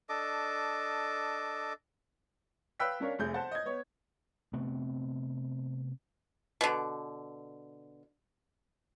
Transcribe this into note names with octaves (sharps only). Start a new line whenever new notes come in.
D4 A4 D#5 D6
B4 F5 G5 E6 F#6 B6
C#4 D4 A#4 C#5 F5
F1 A3 G#4 G6
C5 F#5 A5
D#5 G#6
B3 C#5
C3 A3 B3 C4
B2 D3